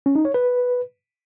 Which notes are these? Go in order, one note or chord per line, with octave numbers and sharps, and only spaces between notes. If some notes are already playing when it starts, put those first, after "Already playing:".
C#4
D#4
C#5
B4